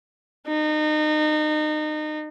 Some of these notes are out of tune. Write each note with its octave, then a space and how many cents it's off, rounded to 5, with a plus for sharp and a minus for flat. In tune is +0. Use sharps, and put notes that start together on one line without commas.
D#4 -30